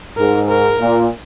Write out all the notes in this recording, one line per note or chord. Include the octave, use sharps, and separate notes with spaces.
G#2 A#4
A#4
A#2